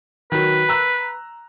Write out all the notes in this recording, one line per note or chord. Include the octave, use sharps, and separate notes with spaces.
D#3 F#3 B4
A#5 E6 F#6